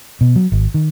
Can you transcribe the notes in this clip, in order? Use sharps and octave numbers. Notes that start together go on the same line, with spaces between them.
B2
F#3
G#1
D#3